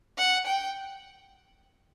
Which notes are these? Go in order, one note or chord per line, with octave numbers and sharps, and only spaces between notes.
F#5
G5